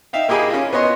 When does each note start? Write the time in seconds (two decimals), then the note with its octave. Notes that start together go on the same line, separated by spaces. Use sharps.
0.13 D#4 E5 F5 G5
0.29 A#3 E4 G4 G#4 D#5 B5
0.50 C#4 F4
0.73 B3 C#5 D#5 C6 C#6